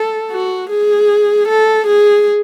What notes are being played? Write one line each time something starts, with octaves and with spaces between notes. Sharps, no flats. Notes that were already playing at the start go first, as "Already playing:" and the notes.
Already playing: A4
F#4
G#4
A4
G#4